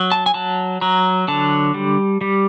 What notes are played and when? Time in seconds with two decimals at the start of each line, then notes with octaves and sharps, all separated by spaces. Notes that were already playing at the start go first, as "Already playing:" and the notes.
Already playing: F#3
0.12 A5
0.26 G#5
0.34 F#3 A5
0.81 F#3 A#5
1.28 D3 A5
1.74 G3
2.21 G3